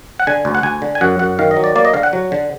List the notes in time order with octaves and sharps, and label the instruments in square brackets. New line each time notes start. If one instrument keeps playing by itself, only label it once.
[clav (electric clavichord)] F#5
D3 G#5
D2
F#5
D2 G#5
D3
G#5
F#2 F#5
F#2 F#5
D#3 F5
D#5
F#3
D5
A#3 D5
D#5
D3 F5
F#5
F#3
D3